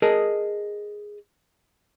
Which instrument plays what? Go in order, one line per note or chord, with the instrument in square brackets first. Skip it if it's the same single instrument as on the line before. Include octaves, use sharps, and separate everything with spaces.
[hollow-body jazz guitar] G#4 A#4 D#5 A5